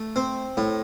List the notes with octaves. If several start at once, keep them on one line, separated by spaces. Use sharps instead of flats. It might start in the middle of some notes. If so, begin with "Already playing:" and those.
Already playing: A3
C4
A2